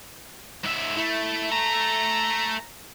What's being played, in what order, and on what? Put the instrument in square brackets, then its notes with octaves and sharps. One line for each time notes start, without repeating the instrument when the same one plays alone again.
[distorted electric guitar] G#2 E5
[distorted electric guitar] A3 [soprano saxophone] E4
[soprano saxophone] A#5